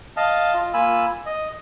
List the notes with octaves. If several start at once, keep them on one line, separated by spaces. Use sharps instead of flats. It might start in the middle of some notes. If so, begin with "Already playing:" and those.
D#5 F5 A5
F4
A#3 F4 G#5 B5 E6
D#5